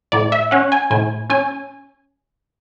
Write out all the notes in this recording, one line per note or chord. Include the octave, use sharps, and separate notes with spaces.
A2 D5
E5
C#4 F#5
G#5
A2 G#5
C#4 G#5